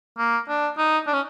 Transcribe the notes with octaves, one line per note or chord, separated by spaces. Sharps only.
A#3
D4
D#4
D4
C#4